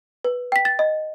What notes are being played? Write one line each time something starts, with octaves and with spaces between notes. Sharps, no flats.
B4
G5 B6
A6
D#5